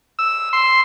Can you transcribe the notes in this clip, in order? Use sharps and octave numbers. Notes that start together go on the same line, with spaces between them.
E6
C6